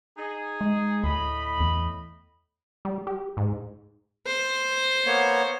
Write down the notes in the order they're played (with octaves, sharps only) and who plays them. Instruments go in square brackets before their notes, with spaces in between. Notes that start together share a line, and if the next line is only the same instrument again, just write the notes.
[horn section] D#4 G#4
[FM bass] G#3
[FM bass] D2 [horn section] A2 D#5 B5
[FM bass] E2
[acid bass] G3
G4
G#2
[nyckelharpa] C5
[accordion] A#3 B3 C#5